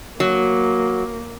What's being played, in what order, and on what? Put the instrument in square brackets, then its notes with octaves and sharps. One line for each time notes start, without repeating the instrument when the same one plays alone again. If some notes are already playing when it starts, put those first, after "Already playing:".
[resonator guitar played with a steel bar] F#3 [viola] A#3